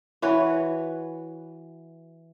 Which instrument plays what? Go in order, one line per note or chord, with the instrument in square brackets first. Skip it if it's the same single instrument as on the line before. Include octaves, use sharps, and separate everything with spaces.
[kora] E3 F#4 B4 C#5